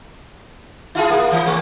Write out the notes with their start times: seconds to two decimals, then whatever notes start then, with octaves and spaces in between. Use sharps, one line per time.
0.95 E4 F4 G#4
1.10 A#3
1.32 E3
1.46 A3 C4